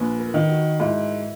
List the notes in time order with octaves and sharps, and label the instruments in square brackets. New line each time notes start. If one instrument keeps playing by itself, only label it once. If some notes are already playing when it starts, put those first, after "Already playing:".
Already playing: [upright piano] A#1 [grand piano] B4
[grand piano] A#4
[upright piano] D#3
[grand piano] F#4
[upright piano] G#2 [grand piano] E4